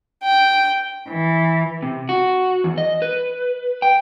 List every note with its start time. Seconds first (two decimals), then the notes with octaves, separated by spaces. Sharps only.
0.23 G5
1.07 E3
1.82 C3
2.09 F#4
2.64 E2
2.78 D#5
3.02 B4
3.82 G5